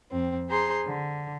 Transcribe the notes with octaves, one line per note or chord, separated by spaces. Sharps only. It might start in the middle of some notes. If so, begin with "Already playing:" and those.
F2 C4
G#4 C5 A#5 C6
D3